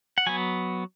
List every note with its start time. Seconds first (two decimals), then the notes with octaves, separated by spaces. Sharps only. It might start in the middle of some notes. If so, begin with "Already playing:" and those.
0.18 F#5
0.27 F#3 B3 G#5